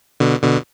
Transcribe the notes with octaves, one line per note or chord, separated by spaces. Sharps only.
B2 D3
B2 D3